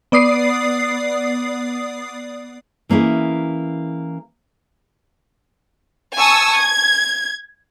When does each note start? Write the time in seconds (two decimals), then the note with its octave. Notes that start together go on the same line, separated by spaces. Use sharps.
0.12 B3 D5 D#6 C7
2.89 E3 A#3 C#4 E4 G#4
6.16 G#5 A5 C#6 D#6 E6
6.58 G#6